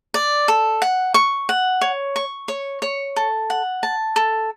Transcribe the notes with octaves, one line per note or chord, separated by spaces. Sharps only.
D5
A4
F#5
C#6
F#5
C#5
C#6
C#5
C#5
A4
F#5
A5
A4